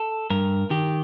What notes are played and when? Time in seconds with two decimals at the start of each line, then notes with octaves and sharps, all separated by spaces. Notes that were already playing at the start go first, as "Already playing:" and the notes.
Already playing: A4
0.30 G2 A#4
0.70 D#3 G4